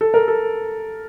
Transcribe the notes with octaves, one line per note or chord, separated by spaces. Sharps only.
A4
A#4
A4